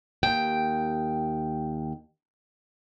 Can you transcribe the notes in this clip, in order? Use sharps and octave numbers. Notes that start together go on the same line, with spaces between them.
D#2 G5